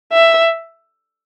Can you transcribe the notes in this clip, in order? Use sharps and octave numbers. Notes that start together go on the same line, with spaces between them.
E5